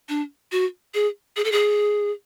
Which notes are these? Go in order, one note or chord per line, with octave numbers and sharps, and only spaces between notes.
D4
F#4
G#4
G#4
A4
G#4